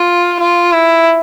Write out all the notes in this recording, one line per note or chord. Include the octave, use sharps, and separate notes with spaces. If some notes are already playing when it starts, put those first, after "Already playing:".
Already playing: F4
F4
E4